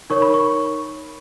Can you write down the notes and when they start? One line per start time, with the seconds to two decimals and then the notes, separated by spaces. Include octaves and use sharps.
0.10 D#4 A#4 C#5 C#6
0.22 B5
0.34 C#6